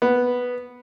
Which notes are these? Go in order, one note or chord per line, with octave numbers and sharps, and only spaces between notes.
B3